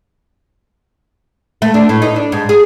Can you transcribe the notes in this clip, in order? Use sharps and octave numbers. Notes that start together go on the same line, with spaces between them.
A3
D4
A2
D#4
D4
G#2
G#4